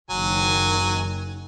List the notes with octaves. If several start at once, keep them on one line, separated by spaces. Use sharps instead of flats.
F#1 D#3 F#3 G#5